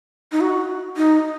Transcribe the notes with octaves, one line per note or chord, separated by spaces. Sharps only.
D#4
F#4
D#4